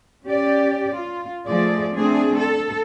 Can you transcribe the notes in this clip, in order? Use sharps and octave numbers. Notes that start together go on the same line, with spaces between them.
C#4 G4 D5
F4
F3 A3 G#4 D5
A3 C4 D4 G#4
A4